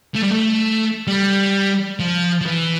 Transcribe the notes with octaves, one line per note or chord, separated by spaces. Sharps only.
A3
G3
A3
G3
F3
F3
E3